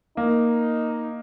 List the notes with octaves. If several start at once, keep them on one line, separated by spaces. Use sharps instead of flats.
A#3 D#4